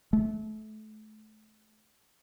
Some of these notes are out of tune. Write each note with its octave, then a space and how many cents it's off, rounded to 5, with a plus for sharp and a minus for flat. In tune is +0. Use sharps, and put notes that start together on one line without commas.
A3 -30